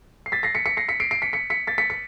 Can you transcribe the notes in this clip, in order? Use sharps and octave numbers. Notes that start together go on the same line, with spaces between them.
C7
A6 B6
A#6 C7
B6 C#7
B6 C#7
A#6 C7
B6 C#7
C7 D7
C7 D7
B6 C#7
B6 C#7
B6 C#7
A6 B6
B6 C#7
B6 C#7